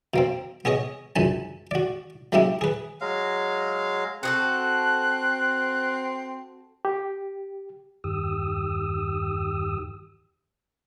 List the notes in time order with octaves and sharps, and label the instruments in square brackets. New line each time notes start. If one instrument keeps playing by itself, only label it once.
[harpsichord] B2 A#3 C4
B3 G#4 C#5 D#5
C#2 F#2 G#5 A5
F#4 D5
F#3 G#3 A#3 C#4 E4 G4
G#4 B4
[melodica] F#3 G#3 F5
[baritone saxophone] C4 [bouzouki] F#4 G#4 A4 [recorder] F#6
[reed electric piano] G4
[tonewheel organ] E2 G2 D#3 G4 D#6 E6